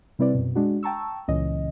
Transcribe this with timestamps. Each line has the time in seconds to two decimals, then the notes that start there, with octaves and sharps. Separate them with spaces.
0.19 C3 G3 C4 E4 B4 D5
0.35 F#2 B2
0.55 G#3 D4 F#4
0.83 G5 A5 A#5 C#6 E6
1.28 C#2 A#2 C#3 E3 C#4 D#5